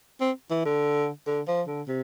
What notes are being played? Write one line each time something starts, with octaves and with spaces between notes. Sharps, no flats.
C4
E3
D3
D3
F3
D3
C3